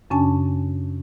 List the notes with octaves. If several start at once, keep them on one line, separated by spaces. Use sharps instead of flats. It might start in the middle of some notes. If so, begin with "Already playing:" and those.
F#2 C#3 C#4 D4 G#5 A5